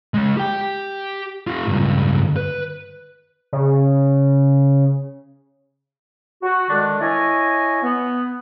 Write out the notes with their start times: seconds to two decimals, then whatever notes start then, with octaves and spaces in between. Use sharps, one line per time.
0.14 G#3 C#5
0.37 G4 G5
1.47 F4 G4
1.67 C#2 G2
2.36 B4
3.53 C#3
6.42 F#4
6.69 D3 D#3 G#3 D4
7.00 E4 C#5 D#5 G#5
7.83 B3